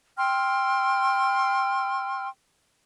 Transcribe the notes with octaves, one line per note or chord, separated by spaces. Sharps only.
G5 C6 E6 F6